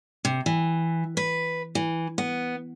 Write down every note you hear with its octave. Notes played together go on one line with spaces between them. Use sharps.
C3
E3
B4
E3
B3